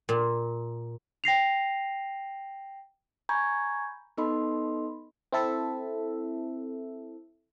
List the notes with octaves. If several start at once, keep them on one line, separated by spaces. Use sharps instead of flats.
A#2
G5 A#6 C7 F7
G#5 A#5 B5 C#6 G6 G#6
B3 D#4 A4 D#5 B5 C6
C4 E4 A4 E5